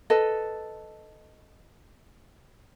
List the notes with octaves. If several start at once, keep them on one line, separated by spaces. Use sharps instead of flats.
A4 B4 D#5